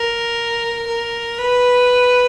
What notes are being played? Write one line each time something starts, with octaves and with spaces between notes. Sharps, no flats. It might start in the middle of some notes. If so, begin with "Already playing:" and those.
Already playing: A#4
A#4
B4